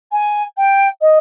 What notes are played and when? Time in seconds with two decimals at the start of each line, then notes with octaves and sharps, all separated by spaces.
0.12 G#5
0.57 G5
1.01 D#5